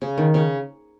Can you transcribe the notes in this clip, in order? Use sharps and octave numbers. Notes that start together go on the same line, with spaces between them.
C#3
D#3
C#3